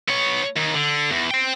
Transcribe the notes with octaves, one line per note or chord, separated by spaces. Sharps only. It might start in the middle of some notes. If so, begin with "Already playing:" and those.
B3 C#5
D#2
D3
E2
C5 G5